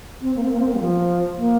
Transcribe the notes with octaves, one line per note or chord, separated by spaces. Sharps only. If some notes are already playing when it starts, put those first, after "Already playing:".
C4
A#3
C4
A#3
C4
A#3
G3
F3
A#3